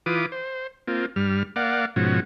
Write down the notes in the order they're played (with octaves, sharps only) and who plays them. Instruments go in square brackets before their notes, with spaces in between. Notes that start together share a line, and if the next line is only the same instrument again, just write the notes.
[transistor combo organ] E3 F4 B4 D6 D#6
C5
A#3 C4 F4
G2 G3 F6
A#3 D5 F5 F#5
G#2 B2 F3 C#4 F#4